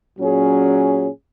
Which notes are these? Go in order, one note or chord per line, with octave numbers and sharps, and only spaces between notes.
A#2 F#3 C#4 G#4